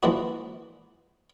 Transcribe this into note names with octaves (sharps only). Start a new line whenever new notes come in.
E3 F3 G#3 A#3 D4 F#4